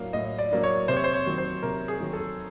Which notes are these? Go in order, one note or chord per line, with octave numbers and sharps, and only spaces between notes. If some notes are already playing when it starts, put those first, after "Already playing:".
Already playing: A2 F#3 A#3 D4 F5
A2 D#5
D5
F#3 A#3 D4
C#5
C3 C5
C#5
C5
C#5
D#3 F#3
C5
C3 A#4
G#4
D#3 F#3
A4